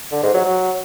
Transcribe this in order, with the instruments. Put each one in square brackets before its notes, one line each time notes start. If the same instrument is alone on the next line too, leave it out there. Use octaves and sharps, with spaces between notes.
[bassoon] D3
G#2
F#3
F#3